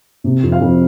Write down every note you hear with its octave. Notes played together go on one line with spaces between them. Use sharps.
C3
F2
F5
F2